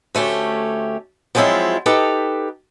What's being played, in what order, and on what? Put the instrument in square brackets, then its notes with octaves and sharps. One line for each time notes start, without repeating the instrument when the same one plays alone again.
[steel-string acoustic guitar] D2 A3 C#4 G4
F3 F#3 G#3 C4 E4 F4
D#4 G4 A4 B4